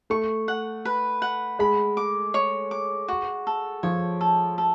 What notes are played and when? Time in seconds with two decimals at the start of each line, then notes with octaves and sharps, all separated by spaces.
0.10 A3 C#6
0.48 F#5
0.85 B4
1.22 F#5
1.59 G#3 B5
1.97 D6
2.34 C#5
2.71 D6
3.08 F#4
3.47 A4
3.83 F3 C#5
4.21 A4
4.58 A4